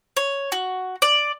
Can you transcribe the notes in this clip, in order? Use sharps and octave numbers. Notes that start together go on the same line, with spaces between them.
C#5
F#4
D5